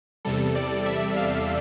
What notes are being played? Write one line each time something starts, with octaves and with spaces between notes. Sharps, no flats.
E2 C3 G3 A4
D5
E5
F5